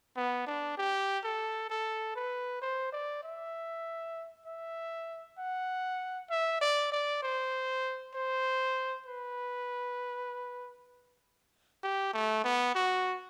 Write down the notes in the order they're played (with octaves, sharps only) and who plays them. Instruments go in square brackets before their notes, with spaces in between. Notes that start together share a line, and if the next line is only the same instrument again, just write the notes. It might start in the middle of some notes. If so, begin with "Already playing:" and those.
[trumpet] B3
D4
G4
A4
A4
B4
C5
D5
E5
E5
F#5
E5
D5
D5
C5
C5
B4
G4
A3
B3
F#4